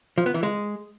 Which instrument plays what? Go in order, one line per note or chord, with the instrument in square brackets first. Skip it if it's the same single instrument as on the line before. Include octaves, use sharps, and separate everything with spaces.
[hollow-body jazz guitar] F3
B3
E3
G#3